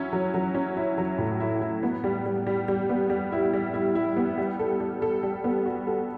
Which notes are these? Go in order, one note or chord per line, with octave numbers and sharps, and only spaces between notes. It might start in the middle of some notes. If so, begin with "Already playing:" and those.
Already playing: F#3 C#4 E4
F#3
F#3
C#4
E4
F#3
A2
E4
E4
B3
G3
G3
G3
G3
B3
G3
E4
G3
E4
E4
B3
G3
A4
G3
A4
G3
B3
F#4
A4